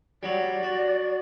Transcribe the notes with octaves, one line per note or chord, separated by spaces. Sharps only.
F#3 G3 D5
F#4